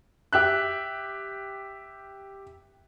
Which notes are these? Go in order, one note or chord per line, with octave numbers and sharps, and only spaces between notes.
G4 E5 F#6